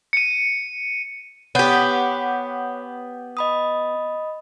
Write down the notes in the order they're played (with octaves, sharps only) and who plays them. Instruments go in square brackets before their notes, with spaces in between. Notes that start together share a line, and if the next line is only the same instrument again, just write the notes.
[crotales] C#7 D#7
[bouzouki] B3 G4 [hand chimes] C#5 F#5 G6
[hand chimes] D#5 B5 D#6